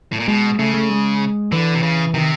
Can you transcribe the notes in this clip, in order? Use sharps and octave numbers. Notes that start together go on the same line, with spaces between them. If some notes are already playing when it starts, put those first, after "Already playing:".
A2
A#2
B2 G#3
C#3 A3
A3
G#3
D3 E3
C3
C#3
C3 D#3